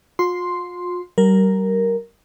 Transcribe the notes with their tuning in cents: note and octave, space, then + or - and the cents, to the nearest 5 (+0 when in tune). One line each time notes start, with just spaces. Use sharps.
F4 +40 C6 +0
G3 -35 A#4 +0